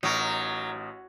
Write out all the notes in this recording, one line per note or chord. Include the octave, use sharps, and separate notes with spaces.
A1 F#3 D#4 A#4 C#6